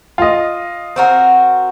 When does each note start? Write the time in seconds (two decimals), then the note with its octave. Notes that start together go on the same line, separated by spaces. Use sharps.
0.18 F4 D#5
0.96 C4 F#4 A#4